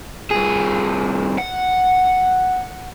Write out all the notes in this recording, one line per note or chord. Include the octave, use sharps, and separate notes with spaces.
C2 G#4
F#5